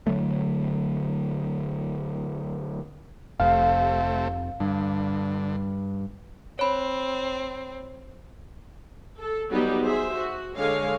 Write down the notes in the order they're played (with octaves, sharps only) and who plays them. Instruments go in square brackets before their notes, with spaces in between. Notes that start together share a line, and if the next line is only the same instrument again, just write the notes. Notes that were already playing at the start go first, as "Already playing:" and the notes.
[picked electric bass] D3 F#3 A3
[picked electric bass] F1 [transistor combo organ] C3 A3 [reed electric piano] F5
[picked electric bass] G2 [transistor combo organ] D3
[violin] C4 [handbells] C#5 B5
[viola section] A4
F#3 G3 B3 D#4 G4 G#4
G#4 C5 E5
F#4
D3 G#3 C#5 F5 G#5